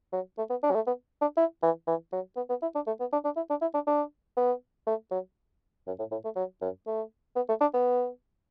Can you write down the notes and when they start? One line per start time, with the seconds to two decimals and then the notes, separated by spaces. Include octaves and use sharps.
0.12 F#3
0.38 A3
0.50 B3
0.63 D4
0.71 F#3
0.75 A3
0.87 B3
1.21 D4
1.37 E4
1.63 E3
1.87 E3
2.12 F#3
2.36 B3
2.49 B3
2.62 E4
2.75 D4
2.87 A3
3.00 B3
3.13 D4
3.25 D4
3.36 E4
3.50 D4
3.61 E4
3.74 D4
3.87 D4
4.37 B3
4.87 A3
5.11 F#3
5.87 F#2
5.99 A2
6.11 A2
6.24 A3
6.36 F#3
6.61 F#2
6.87 A3
7.36 B3
7.49 A3
7.61 D4
7.74 B3